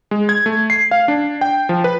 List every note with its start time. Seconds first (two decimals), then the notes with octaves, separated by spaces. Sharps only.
0.11 G#3
0.29 G#6
0.46 A3
0.70 C7
0.91 F5
1.08 D4
1.41 G5
1.69 F3
1.84 B4